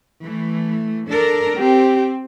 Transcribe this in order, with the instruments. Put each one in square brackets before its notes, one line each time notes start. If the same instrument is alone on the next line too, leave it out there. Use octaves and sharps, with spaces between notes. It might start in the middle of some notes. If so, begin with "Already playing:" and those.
[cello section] E3 A3
D4 A4 A#4
[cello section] C4 [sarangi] G4